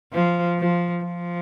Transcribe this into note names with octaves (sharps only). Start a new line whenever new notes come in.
F3
F3
F3